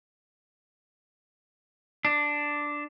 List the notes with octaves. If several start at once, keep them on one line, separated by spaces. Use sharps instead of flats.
D4